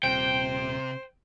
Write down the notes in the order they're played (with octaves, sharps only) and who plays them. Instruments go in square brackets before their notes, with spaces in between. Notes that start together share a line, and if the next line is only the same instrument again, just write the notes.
[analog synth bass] D#1 [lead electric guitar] C3 [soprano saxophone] C5 [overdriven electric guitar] G5